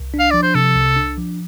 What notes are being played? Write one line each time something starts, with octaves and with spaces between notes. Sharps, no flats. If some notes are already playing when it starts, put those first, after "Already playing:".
Already playing: C2
D4
F5
F3 D5
C5
C3 A4
C2
D4
F3